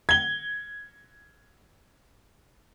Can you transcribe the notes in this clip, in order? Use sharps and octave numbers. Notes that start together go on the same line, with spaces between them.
G#6 G7